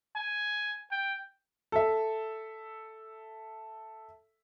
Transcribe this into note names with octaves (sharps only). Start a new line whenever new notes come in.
G#5
G5
A4 E5